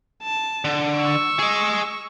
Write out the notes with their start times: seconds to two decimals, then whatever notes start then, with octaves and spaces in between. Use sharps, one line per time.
0.23 A5
0.64 D3
0.96 C#6 E6
1.39 G#4 D#5